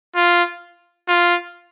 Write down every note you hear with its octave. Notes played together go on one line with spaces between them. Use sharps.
F4
F4